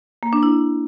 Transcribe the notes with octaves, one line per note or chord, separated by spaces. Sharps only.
A#3
D4
E4